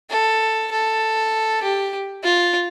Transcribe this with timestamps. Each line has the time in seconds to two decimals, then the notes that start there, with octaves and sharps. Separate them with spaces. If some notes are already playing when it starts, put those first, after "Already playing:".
0.10 A4
0.72 A4
1.63 G4
2.24 F4